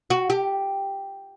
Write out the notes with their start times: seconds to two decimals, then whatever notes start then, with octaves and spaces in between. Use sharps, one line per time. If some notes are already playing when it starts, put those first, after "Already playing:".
0.10 F#4
0.30 G4